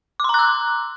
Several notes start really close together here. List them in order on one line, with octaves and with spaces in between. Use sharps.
D6 C6 A#5 F#6 E6